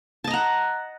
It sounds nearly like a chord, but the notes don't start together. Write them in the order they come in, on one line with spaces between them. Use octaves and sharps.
A5 D#5 A#5 F#5